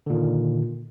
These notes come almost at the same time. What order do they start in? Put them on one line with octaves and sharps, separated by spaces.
D3 A#2 D#3